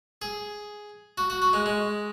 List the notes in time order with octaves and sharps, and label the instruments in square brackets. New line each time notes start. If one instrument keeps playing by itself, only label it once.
[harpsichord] G#4
F#4
F#4
F#4
G#3
G#3